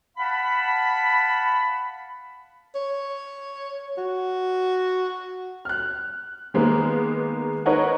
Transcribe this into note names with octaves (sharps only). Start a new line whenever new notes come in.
F5 F#5 A5 B5
C#5
F#4
F6 F#6
D#3 G#3 A#3 B3
D#4 A#4 B4 C#5 D#5 F#5